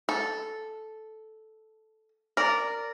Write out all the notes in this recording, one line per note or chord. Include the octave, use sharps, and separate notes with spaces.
A4
A#4 D5